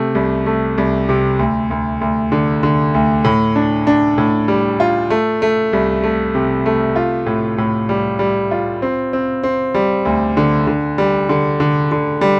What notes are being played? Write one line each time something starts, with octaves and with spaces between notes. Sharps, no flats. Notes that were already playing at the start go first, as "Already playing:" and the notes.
Already playing: C3 A3
C2
A3
C2
C3
D2
D2
D2
D3
D3
D2
A2
D4
D4
A2
G3
F4
A3
A3
C2
A3
C3
A3
F4
A2
A2
G3
G3
F4
C4
C4
C4
G3
D2
D3
D3
G3
D3
D3
D3
G3